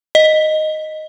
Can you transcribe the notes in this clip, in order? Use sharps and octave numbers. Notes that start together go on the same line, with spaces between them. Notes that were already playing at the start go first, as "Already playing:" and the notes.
D#5